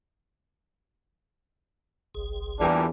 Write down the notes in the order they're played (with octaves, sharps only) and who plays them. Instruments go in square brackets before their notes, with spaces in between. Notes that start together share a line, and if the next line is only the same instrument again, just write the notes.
[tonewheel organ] G1 C2 G#4
[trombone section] E2 [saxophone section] A#2 G3 [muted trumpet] D4